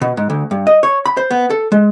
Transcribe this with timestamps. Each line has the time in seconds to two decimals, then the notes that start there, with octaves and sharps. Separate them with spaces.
0.02 B2
0.17 G#2
0.30 D2
0.51 G2
0.67 D#5
0.83 C#5
1.06 B5
1.17 C5
1.31 B3
1.50 A4
1.72 G#3